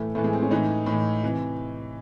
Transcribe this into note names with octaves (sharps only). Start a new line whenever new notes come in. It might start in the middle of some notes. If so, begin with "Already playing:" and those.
Already playing: A2 E3 A3
A2 E3 A3
G#3
C4
C#4
A2 E3 D#4
A2
E3
C3 E3